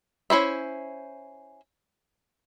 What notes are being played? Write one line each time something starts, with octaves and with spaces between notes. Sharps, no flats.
C#4 E4 C5 E5